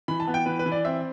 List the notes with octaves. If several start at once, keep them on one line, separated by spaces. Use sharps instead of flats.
E3 B5
A5
B3
G5
E3 B4
B4
E3
D5
C4 E5